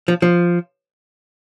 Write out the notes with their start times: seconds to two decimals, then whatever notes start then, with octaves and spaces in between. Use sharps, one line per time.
0.08 F3
0.22 F3